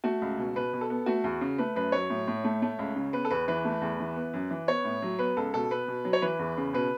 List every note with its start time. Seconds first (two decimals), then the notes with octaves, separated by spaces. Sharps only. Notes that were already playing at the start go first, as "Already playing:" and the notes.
0.04 A3 F#4
0.22 C#2
0.38 B2
0.56 B2 B4
0.73 B2
0.81 A4
0.90 B3
1.06 A3 F#4
1.24 E2
1.41 C#3
1.58 A3 B4
1.75 F#2 B4
1.92 F#3 C#5
2.10 A2
2.27 A2
2.44 A3
2.62 A3
2.79 C#2
2.96 C#3
3.13 B3 B4
3.25 A4
3.31 E2 B4
3.48 E3 B4
3.65 A3
3.82 E2
4.00 E3
4.16 B3
4.33 F#2
4.50 E3
4.68 B3 C#5
4.85 A2
5.02 F#3
5.19 B3 B4
5.37 C#2 A4
5.54 B2 A4
5.71 B3 B4
5.88 B2
6.05 F#3
6.13 C#5
6.22 E3 B4
6.39 E2
6.57 C#3
6.73 B2 B4